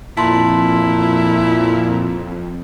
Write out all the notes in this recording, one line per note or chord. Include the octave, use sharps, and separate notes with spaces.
F2 A#2 E4 A5 C6